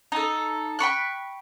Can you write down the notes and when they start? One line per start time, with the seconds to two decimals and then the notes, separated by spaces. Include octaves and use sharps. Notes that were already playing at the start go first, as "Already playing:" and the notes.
0.12 D#4 A4
0.79 G5 B5 C#6 F#6